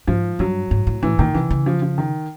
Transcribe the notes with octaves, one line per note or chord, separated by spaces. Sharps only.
G#2 F3
G2 F#3
G#2
A2
A2 E3
A#2 D#3
C3 E3
C#3
F3
F3
D#3